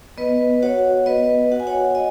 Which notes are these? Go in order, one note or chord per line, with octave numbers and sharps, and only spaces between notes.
B3 B4 D#5
F#4 C#5 F#5
B3 B4 D#5
F#4 F#5
G#5
C#5 F#5
F#5
D#5 G#5